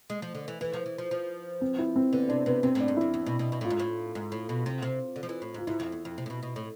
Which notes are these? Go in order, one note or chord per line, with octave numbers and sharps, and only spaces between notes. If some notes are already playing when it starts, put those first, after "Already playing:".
G#3
F3
D3
E3
E3 B4
F3
E3
F3
F3
C4
E4
C4
D3 B3
C3 D4
C3 B3
C3 C4
A2 D4
G#2
F2 E4
E2
B2
B2
B2
A2 F4
G#2
A2
G#2
A2
B2
C3
C3
D3
F3
E3
A2
G#2 F4
G#2 E4
F2
E2
F2
C3
A2
B2
B2
A2